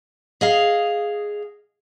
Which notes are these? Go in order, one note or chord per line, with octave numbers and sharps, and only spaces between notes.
G#4 D#5 F5